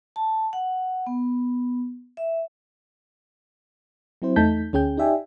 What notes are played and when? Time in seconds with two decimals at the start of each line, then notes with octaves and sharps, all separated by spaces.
0.16 A5
0.53 F#5
1.07 B3
2.17 E5
4.22 F#3 C4 E4 C5
4.36 E2 A3 D#4 A5 G6 B6
4.73 D2 C#4 G#4 G5 G6
4.97 D#4 G4 D5 E5 G5 G#5